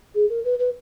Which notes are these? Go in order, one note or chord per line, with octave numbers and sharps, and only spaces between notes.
G#4
A#4
B4
B4